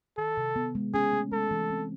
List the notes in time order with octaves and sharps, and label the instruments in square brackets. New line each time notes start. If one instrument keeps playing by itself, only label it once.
[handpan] D#3 [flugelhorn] A4
[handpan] C3
B3
G#3
[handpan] C#4 [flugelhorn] G#4
[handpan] A3
[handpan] G#3 [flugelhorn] A4
[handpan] E3
C4